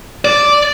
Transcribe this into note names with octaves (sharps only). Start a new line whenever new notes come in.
D5